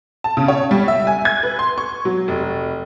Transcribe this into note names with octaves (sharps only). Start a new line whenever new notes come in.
A5
C#3
C#5
G3
E5
G#5
G#6
B4
C6
C#6
F#3
F1